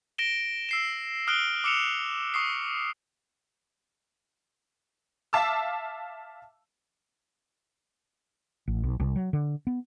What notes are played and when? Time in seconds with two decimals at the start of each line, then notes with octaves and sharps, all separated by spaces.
0.18 A#6 D7 E7 G7
0.69 E6 C7 E7
1.27 D#6 F6 F#6 D7 G7
1.64 D6 E6 C#7 E7 F7
2.34 C#6 D#6 C7
5.33 E5 F5 A5 D6 E6
8.68 A1
8.84 B1
9.00 C2
9.16 F#3
9.33 D3
9.67 B3